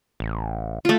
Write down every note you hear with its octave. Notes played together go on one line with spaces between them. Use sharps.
A1
A3 F4